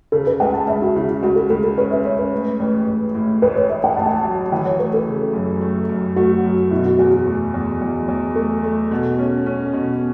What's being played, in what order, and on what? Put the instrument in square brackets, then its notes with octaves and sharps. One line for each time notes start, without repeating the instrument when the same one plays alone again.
[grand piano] C#3 [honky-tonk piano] A4
[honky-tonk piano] B4
[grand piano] C#2 [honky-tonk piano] F#5
[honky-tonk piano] A5
[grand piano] C#2 [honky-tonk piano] E5
[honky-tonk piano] F#4
[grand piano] C#3 [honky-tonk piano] E4
[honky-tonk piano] E4
[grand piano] C#2 [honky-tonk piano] F#4
[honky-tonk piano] A4
[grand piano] C#2 [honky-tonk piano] A4
[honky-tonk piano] A4
[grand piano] C#4 [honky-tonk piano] B4
[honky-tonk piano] E5
[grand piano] C#4 [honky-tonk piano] C#5
[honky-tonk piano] B4
[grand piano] A2
A1
A1
A2
[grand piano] A1 [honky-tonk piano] B4
[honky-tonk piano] C#5
[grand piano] A1 [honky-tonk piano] E5
[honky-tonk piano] F#5
[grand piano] A1 [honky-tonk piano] A5
[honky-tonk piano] F#5
A5
[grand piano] F#3
[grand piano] E3 [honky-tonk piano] F#5
[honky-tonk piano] C#5
[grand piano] A3 [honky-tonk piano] B4
[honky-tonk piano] A4
[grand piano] C#3
F#2
A3
F#2
[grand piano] A3 [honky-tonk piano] F#4
[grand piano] F#2
[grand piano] B2 [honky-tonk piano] E4
[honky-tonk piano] F#4
[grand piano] E2 [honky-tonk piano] F#4
[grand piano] A3
E2
E2
E2
[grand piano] A3 [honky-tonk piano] A4
[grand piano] A3
B2
C#4
C#4
B2